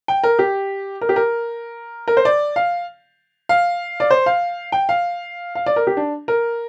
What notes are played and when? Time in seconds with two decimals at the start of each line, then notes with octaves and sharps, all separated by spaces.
0.08 G5
0.24 A#4
0.39 G4
1.01 A#4
1.09 G4
1.16 A#4
2.08 A#4
2.17 C5
2.25 D5
2.56 F5
3.49 F5
4.00 D5
4.11 C5
4.26 F5
4.72 G5
4.89 F5
5.55 F5
5.66 D5
5.76 A#4
5.87 G4
5.97 D4
6.28 A#4